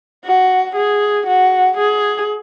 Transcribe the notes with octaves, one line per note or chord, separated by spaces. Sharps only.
F#4
G#4
F#4
G#4